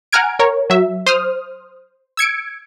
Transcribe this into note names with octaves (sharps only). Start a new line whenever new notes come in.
F#5 G#5 A#5 F6 G#6 D7
A#4 C#5
F#3 E5
C5 D#6 F6
E6 G#6 C#7 D7